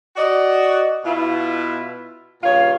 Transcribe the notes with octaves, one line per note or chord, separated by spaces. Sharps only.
F#4 D5 D#5
B2 E4 F4
G2 A#2 C#3 F4 C#5 F5